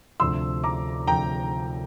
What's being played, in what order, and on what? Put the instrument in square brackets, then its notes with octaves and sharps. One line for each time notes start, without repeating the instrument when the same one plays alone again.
[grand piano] D2 C3 F3 [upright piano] C6 E6
[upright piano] A#5 D6
[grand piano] D2 C3 F3 [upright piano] G5 A#5